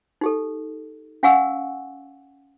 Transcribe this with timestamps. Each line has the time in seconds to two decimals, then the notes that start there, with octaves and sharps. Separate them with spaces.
0.21 D#4 G4 A4
1.23 C#4 F5 F#5 G#5 C#6 E6